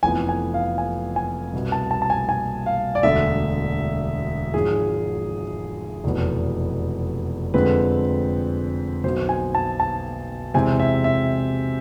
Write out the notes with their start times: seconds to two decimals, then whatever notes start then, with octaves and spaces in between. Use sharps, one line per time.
0.03 F1 F2 E3 B3 G#5
0.29 G#5
0.54 F5
0.78 G#5
1.16 G#5
1.53 C2 B2 B3
1.72 A5
1.91 A5
2.02 A5
2.10 G#5
2.29 G#5
2.66 F5
2.95 D5
3.03 E1 D2 D3 E5
4.54 G#1 G#2 F3 G#4
6.04 F1 E2 B2 B3
7.54 F2 D3 G#3 C4 B4
9.04 B1 B2 B3 C5
9.29 G#5
9.55 A5
9.80 A5
10.54 E2 C3 E3 G#3 C4 G#5
10.79 E5
11.04 E5